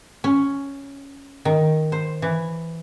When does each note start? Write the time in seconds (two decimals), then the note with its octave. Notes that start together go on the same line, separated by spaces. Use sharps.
0.24 C#4
1.45 D#3
1.92 C5
2.22 E3